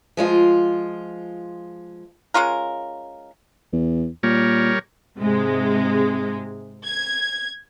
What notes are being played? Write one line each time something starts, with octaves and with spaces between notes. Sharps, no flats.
F3 G#3 F4
G#3 C#4 F4 A#4
E2
A#2 G3 A#4 C#5
G#2 C3 G#3
G#6